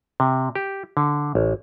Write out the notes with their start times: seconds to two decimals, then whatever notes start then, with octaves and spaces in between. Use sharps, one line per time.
0.20 C3
0.56 G4
0.97 D3
1.35 A1